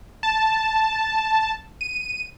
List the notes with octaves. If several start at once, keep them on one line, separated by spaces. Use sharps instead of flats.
A5
D#7